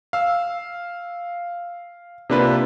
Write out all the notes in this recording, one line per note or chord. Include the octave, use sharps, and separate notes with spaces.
F5 E6
C3 A#3 D4 F4 B4